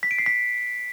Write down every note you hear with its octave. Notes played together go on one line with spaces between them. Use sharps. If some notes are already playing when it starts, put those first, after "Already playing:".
B6
D7
C7
B6